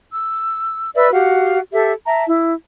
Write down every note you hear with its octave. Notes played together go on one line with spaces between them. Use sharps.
E6
B4 D5 E5 E6
F#4 G4 F5 F#5
G4 A4 E5
E5 A5 A#5
E4